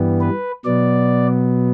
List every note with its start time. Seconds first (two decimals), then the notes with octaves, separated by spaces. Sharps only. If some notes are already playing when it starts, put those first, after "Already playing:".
Already playing: G2 E3 G3 B3
0.21 B4
0.65 B2 F#3 B3 D5